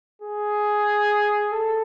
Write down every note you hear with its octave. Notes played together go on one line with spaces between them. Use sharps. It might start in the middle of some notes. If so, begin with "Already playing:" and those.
G#4
A4